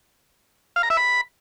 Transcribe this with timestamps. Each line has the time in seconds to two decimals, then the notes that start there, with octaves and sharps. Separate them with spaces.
0.76 F5
0.83 A#5
0.90 E5
0.97 B5